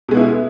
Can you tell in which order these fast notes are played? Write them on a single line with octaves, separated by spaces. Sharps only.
B2 G#3 B3 E4